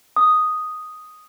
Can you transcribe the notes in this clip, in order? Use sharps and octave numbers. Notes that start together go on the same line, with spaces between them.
D#6